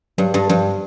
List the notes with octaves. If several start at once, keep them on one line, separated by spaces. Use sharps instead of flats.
G2 F#3
G2
G2 F3